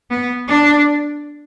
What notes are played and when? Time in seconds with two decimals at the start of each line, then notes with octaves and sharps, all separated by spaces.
0.10 B3
0.48 D4